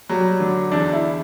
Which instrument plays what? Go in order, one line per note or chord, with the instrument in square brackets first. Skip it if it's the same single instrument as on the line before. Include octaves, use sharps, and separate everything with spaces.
[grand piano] F#3 [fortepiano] G3
[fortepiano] D3
[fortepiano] E2 [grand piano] D4
[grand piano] E4